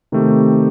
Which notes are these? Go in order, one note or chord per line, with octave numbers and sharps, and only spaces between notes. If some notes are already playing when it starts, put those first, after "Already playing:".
C3 D#3 A3 C4 G4